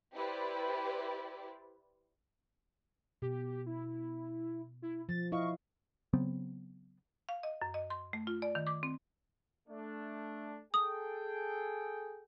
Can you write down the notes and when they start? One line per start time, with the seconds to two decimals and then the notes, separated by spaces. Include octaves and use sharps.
0.14 E4 G4 B4 C5 D5
3.22 B2 G4
3.66 E4
4.82 E4
5.09 F3 A6
5.32 E4 D#5 F5 C#6
6.13 C#3 F#3 B3 C4
7.29 F5
7.43 D#5
7.62 F#2
7.74 D#5
7.90 C6
8.13 A3
8.27 F4
8.42 D5
8.55 D#3
8.67 D6
8.83 C4
9.69 A3 D4
10.74 G#4 A4 G5 D#6